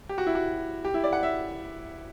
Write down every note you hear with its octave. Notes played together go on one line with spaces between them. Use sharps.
G4
F#4
E4
F#4
G4
E4
D5
F#5
E5